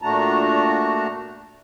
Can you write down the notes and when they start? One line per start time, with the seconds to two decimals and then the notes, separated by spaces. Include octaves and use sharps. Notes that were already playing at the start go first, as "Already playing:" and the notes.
0.02 A#2 A3 D4 F#4 A5 A#5